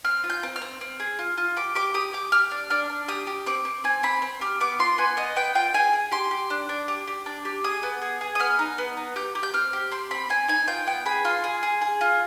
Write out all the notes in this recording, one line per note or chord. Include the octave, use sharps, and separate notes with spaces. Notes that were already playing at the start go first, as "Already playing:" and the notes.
C4 F6
F4
G6
C4
F6
C4
C4
G#4
F4
F4
G4 D6
G4 D6
G4 D#6
G4 D6
G4 F6
D4
D4 F6
D4
G4 D#6
G4
C4 D6
C4
C4 G#5
C4 B5
C4
G4 F6
B3 D6
F4 C6
B3 G#5
B3 D#5
B3 G5
F4 G5
G#4 G#5
G#4
G4 C6
G4
D4
D4
G4
G4
D4
G4
G#4 D#6
B3
G#4
G#4
D#6
B3 F6
D#4
B3
D#4
G4 G6
G4
G6
C4 F6
G4
C4 C6
C4 B5
C4 G#5
D#4 G#5
F4 G5
B3 G5
G#4 B5
F4 C6
G#4
G#4
G#4
F4